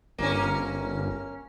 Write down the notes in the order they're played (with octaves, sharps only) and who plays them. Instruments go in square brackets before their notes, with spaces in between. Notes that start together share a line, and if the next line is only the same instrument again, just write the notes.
[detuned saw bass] G1 [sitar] A#3 C#4